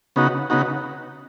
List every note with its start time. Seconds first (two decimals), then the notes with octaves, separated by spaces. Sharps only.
0.16 C#3 B3 D#4 F#4
0.50 C#3 B3 D#4 F#4